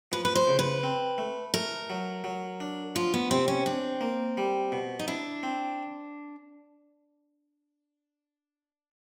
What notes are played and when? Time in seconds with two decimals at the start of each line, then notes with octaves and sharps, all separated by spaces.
0.12 F3 B4
0.25 B4
0.35 C5
0.47 C#3
0.59 B4
0.84 C4
1.18 A3
1.54 A3 A#4
1.90 F#3
2.24 F#3
2.60 D4
2.95 F3 F4
3.14 B3
3.30 C3 C4
3.48 C#4
3.66 C4 D4
4.01 A#3
4.37 G3
4.72 B2
4.99 D#4
5.08 D4 E4
5.43 C4